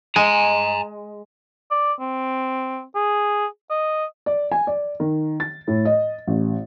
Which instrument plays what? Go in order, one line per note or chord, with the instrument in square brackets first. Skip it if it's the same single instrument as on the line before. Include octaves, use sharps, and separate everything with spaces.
[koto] G#3 [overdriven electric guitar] G#5 A#5
[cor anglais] D5
C4
G#4
D#5
[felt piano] D5
G#5
D5
D#3
A6
A2
D#5
A1